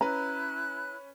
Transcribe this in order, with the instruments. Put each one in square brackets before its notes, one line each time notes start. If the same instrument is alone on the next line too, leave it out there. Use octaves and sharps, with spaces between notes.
[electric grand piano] C#4 B4 [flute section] E4 F#6 [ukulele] A#5